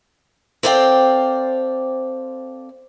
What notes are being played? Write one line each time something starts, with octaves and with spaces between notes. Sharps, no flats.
C4 A4 C5 D5 F5 G5